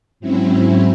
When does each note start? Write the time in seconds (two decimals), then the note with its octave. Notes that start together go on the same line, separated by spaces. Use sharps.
0.20 G#2 F#3 C4 C#4 E4